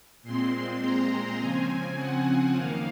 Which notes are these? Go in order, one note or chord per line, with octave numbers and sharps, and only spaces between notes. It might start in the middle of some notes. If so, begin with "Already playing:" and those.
A#2 G#3 C4 C6
A#5
C#3 F3 C4 G#5
F#5
F#2 D#3 A#3 F5